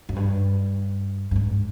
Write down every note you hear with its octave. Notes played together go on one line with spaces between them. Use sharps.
F#2
G2
G2
G#2